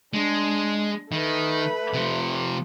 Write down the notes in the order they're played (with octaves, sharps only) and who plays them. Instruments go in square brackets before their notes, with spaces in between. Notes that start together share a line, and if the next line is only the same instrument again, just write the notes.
[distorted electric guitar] G#3 [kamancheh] D4
[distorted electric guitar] D#3 [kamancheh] A3 B4
[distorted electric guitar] C3 F3